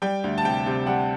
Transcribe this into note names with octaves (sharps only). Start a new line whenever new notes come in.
G3 G5
D2
A5
C3 G5
C3
G3 F#5